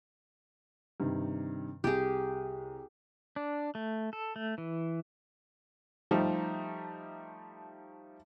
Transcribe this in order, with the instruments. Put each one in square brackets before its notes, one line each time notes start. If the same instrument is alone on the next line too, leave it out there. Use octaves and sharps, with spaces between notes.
[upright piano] G2 C3 D#3
[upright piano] C2 [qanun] G4 G#4
[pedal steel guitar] D4
A3
A4
A3
E3
[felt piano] F3 G3 A3 D#4